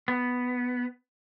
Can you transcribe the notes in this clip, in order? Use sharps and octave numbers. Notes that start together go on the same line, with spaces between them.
B3